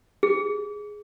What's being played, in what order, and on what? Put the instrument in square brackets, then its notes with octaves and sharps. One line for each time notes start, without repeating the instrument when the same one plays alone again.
[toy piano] G#4